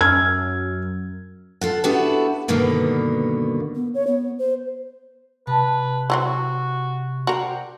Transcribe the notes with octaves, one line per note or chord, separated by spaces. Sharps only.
F#2 E6 F6 G#6
F4 A4 F#5
B3 D4 E4 F#4 G4 A4
G2 B2 D3 D#3 A#3 B3
B3
C#5
B3
C5
C3 B4 A5
E3 F#3 C4 F#4
F#4 A#4 C5 D5 G5